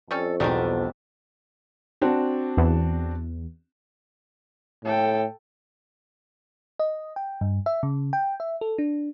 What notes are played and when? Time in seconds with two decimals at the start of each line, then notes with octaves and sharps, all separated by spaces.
0.11 F2 G3 C#4 A4
0.40 B1 E2 B2 D#3 G3 B3 C4 D4
2.01 C4 D4 F#4
2.57 E2
4.85 A2 A4 G5
6.79 D#5
7.16 G5
7.41 G2
7.66 E5
7.83 C#3
8.13 G5
8.40 E5
8.61 A4
8.78 D4